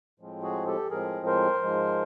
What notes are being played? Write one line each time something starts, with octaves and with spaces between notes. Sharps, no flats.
A2 F3 G#3 C4
F#4 G#4
G4 A4
A2 F3 G#3 C4 G#4 A#4
A#4 C5
G#2 F3 G#3